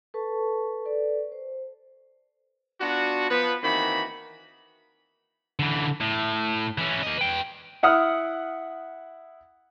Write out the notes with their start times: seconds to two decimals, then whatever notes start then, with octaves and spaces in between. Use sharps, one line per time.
0.14 A4 B4 A5 C#6
0.86 A4 B4 D5
1.32 C5
2.81 B3 D4 F4 F#4
3.30 F3 B3 B4
3.63 D#3 E3 A#3 C4 F#4 B5
5.59 D3 E3
6.01 A2
6.78 E3 C#4
7.03 A#3 D#5
7.18 B4 G5
7.83 E4 F#5 D#6 F6